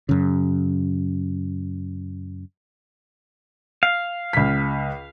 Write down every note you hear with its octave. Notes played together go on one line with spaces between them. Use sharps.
F#2 C#3
F5
C#2 B6